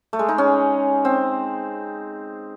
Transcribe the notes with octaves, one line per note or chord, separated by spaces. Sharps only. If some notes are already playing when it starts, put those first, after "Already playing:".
A3
G#3
D#4
C#4
C4